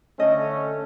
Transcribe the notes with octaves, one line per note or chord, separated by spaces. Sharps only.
D3 A3 C#4 D#5